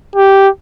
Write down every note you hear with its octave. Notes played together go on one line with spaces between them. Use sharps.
G4